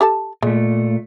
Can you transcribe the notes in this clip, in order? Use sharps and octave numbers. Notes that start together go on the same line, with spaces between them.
G4 A4 A5
A#2 G#3 A3